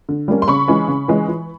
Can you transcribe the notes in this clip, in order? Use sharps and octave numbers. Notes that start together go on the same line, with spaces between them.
D3
G3 A#3 C#4
C6
C#3 B5 C#6
E3 G#3 C#4
C#3
E3 G#3 C#4
E3